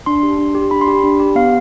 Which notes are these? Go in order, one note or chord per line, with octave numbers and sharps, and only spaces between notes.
D4 C6
G4
D4
G4
D4 B5
C6
G4 B5
D4
G4
B3 F5